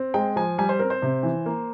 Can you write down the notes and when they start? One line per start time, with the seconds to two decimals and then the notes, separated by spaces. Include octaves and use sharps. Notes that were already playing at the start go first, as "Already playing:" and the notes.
Already playing: C4
0.14 G#3 G5
0.36 F3 G#5
0.58 G3 G#5
0.69 C5
0.79 C4 A#4
0.90 C5
1.02 C3
1.23 E3
1.46 A#3